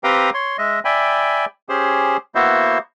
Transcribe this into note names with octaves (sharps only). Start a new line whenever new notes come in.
C4 G4 B4 F5 G5 A#5
C#5 C6
G#3 D#5 E5
D5 E5 G5 G#5 B5
C#4 G4 G#4 C5
A#3 B3 E4 F#4 C5 E5